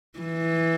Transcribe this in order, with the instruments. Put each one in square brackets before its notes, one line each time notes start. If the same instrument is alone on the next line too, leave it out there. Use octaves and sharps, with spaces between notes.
[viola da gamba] E3